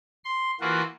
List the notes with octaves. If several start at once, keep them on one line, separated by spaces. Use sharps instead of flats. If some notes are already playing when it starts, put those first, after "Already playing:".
C6
E3 A#3 F4 F#4